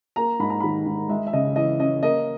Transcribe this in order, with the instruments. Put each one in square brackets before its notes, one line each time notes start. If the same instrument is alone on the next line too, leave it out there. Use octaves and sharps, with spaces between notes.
[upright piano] A#3 A#5
G#2 B5
A#5
D#3 B5
G#2
G#3 E5
E5
C#3 D#5
E3 D#5
C#4 D#5
A#3 D#5